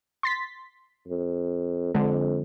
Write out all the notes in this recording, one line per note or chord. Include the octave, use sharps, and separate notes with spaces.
C6 A6 B6
F2
F2 D3 G#3